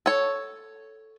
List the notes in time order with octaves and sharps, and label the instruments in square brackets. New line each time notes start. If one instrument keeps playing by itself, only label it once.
[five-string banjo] A4 C#5